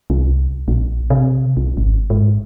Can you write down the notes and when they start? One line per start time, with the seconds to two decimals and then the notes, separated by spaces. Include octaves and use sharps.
0.10 C2
0.68 A#1
1.10 C3
1.57 C2
1.77 G#1
2.10 G#2